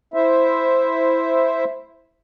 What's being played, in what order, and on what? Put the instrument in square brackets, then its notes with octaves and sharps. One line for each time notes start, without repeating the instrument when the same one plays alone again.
[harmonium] E4 C5 E5